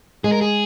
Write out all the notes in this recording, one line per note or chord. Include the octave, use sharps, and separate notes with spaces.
G#3 G#4
A#4
G#4